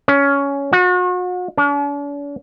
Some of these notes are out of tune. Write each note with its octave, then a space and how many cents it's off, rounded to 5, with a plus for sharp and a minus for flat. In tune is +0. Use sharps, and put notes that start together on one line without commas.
C#4 +15
F#4 -40
D4 -45